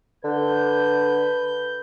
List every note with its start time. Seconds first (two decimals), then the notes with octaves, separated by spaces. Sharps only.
0.24 D3 B4 G6